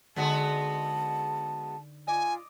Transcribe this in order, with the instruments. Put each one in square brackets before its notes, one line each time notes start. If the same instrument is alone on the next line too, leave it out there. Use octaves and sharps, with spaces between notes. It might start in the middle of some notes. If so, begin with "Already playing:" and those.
[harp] D3 D#4 [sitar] G#3 B3 F#4 [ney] A5
[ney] F4 [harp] D#5 D6 [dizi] G#5